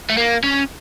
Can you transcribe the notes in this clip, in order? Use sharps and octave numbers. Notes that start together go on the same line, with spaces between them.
A3
A#3
C#4